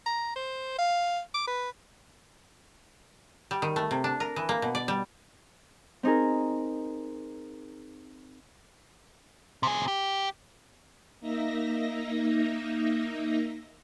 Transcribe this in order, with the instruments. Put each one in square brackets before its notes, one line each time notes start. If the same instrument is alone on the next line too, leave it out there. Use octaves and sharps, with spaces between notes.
[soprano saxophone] A#5
C5
F5
D6
B4
[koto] G3
D#3
A3
C3
D4
A#4
E3
A#3
B2
D5
G3
[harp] C4 D#4 G#4 A#4
[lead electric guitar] C3 G#4
G4
[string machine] A#3 D#4 E5 A#6